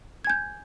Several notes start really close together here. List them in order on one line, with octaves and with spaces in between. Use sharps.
G#6 G#5 G6